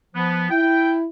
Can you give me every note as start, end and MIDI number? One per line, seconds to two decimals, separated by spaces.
0.15 0.49 53
0.15 0.49 59
0.50 1.06 64
0.50 0.93 79